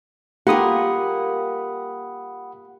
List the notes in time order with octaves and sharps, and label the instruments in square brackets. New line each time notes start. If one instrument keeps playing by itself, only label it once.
[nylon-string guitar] A#3 F4 A#4 [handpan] G4 [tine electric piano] F#5 B5 D#6